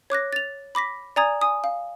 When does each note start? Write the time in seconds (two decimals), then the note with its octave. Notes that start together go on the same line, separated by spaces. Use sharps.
0.10 C#5 D6 F#6 A#6
0.33 A6 F7
0.75 B5 D6 A#6 B6
1.16 D5 G#5 A#5 D#6 G#6
1.41 G#5 D#6
1.64 F5